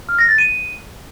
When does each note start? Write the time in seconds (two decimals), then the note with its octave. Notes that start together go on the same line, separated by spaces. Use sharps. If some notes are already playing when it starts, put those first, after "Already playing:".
0.09 F6
0.19 A#6
0.28 A6
0.38 D#7